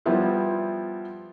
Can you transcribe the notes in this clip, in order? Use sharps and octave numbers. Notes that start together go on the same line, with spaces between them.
F3 G3 B3 E4 F4